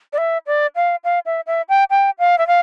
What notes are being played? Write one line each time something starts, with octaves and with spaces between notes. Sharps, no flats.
D5
E5
D5
F5
F5
E5
E5
G5
G5
F5
E5
F5